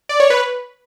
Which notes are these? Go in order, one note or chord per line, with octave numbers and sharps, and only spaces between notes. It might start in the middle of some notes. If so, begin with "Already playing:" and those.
D5
C#5
B4